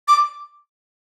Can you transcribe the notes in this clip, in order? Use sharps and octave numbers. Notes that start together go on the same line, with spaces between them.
D6